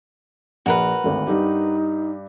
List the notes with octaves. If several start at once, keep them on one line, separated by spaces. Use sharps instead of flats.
A#1 F#4 A#4 B4
G#1 D2
G2 D#4 G4